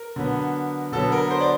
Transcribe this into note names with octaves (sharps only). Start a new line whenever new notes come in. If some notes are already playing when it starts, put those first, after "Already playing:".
Already playing: A#4
D3 F#3 B3
D3 F#3 B3 A4
A#4
C5
D5